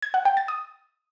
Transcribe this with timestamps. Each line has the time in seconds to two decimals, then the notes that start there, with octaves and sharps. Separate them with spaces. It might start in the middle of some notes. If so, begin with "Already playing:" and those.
0.02 G#6
0.14 F#5
0.25 G5
0.37 A6
0.48 D#6